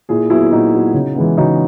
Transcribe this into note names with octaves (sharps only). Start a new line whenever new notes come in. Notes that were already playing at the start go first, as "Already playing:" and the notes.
A#2 E4 G#4
F#3 B3 E4 G#4
A#2 D#4 F#4
F#3 B3
C#3
E3 G#3 B3
C#3 D#4 F#4